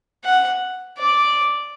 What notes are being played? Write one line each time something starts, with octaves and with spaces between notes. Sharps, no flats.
F#5
D5